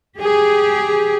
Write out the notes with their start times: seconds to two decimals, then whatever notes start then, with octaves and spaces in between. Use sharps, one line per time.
0.17 G4 G#4